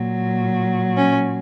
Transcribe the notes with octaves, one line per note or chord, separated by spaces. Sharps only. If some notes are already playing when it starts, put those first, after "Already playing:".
Already playing: A#2 F#3
C#4